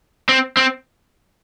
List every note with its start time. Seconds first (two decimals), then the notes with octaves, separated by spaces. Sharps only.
0.29 C4
0.57 C4